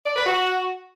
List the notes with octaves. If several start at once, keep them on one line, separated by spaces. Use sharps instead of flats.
D5
B4
F#4